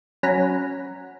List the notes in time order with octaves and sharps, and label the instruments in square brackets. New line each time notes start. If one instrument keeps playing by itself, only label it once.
[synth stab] F#3 C#4 F#5 A#5 B5